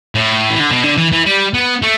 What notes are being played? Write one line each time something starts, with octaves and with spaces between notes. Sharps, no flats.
A2
E3
D3
B2
D3
E3
E3
G3
B3
A3